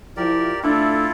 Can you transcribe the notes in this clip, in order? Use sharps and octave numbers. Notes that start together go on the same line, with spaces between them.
F3 E4 G4 A#4 D5
A3 D4 E4 F4 A4